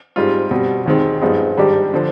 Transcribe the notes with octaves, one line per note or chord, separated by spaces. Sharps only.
G#2 G3 C4 F4
B2 G3 C4
D#2 D#3 G#3 C4
G2 F3 G#3 B3 D#4
G#2 D#3 G3 D4 G4
D3 F3